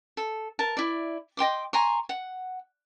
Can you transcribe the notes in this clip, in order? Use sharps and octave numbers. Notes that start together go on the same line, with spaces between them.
A4
A#4 A5
E4 D5
D#5 G5 C6 D6
G#5 A#5 C6 C#6
F#5